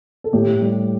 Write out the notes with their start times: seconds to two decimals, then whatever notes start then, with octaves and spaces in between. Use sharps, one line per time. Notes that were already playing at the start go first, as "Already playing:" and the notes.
0.24 A4
0.33 A2 G4
0.62 G3